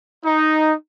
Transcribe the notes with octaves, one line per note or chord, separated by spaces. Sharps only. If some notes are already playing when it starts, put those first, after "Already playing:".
D#4